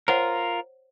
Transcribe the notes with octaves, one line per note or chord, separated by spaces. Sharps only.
F4 A#4 C5 C#5 F#5